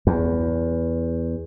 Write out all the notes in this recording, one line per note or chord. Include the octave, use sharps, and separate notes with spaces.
E2